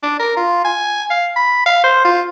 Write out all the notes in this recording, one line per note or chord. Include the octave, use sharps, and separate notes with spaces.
D4
A#4
F4
G#5
F5
B5
F5
C5
F4